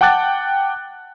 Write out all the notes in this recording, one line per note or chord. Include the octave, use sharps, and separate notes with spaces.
F#5 G5 A5 D6 F#6 A6